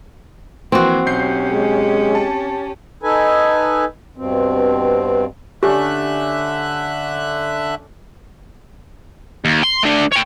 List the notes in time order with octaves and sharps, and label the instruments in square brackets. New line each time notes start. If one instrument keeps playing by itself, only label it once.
[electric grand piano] E3 A#3 [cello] F3 [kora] C4 F#4
[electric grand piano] B1 G6 C7 [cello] C#4 G4
[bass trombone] G#3
[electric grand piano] A5
[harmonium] D#4 A4 B4 G#5
G2 B2 C4
[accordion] D3 E5 F#6 [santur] A3 C#4 D4 [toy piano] G4
[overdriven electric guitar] D#2
C6
A3 D4
C#5 G5